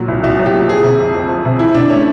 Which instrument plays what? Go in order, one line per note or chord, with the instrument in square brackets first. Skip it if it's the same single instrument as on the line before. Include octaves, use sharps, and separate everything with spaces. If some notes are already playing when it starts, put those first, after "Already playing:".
Already playing: [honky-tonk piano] A#2 F#3 [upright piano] F#4
[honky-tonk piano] C2
[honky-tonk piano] C2 [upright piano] F#4
[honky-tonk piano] F#3
[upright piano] G4
[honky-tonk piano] A#2
[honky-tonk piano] F3 [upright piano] G#4
[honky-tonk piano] C3
F2
F2
F3
C3
[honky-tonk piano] E3 [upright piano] E4
[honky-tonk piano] C3 [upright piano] D4
[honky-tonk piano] A3 [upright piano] C#4